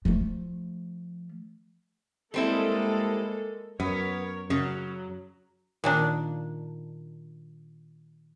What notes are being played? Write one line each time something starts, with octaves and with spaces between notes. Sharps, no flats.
F3 A3
G3 G#3 A#3 C4 E4 A4
F#2 B3 A#4 C#5
F#2 C#3 F#3
A#2 D#3 D4